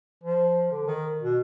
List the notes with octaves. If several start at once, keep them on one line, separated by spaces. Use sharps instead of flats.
F3
D3
D#3
B2